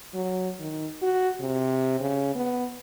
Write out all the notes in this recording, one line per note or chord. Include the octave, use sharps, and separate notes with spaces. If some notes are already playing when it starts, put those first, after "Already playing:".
F#3
D#3
F#4
C3
C#3
B3